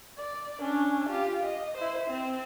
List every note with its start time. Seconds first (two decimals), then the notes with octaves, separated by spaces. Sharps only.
0.18 D5
0.59 C#4 D4
1.09 F4 G4
1.43 D#5
1.77 E4 C5
2.10 C4